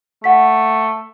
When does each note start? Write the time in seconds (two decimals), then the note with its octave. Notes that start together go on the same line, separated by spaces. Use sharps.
0.24 A3 F#5 B6